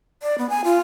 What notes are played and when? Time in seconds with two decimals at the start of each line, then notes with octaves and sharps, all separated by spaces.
0.22 D5
0.38 B3
0.50 G#5
0.64 F4